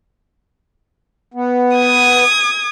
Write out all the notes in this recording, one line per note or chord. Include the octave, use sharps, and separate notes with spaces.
B3
D#6 G#6